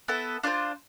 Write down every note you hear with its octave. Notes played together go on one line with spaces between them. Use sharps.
B3 E4 A4 E5
D4 F4 C5